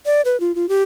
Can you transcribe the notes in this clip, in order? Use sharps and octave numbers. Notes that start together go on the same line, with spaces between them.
D5
B4
F4
F4
G4